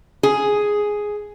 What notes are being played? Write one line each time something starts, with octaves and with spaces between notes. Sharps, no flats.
G#4